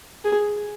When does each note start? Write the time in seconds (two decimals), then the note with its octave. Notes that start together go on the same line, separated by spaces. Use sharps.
0.25 G#4